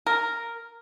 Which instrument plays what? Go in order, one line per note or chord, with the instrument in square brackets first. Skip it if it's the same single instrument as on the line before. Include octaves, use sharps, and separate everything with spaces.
[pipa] A#4